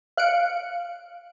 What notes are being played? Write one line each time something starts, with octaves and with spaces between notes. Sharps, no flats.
F5 F#6 C#7 D7